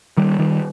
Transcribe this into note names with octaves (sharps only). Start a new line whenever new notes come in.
D#3 G3
D#3 G3